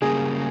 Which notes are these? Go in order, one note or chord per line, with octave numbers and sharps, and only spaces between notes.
C#3 G3 A#3 G#4